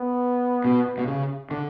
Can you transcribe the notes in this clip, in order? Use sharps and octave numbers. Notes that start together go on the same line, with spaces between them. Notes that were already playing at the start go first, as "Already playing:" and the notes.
Already playing: B3
B2
B2
C#3
D3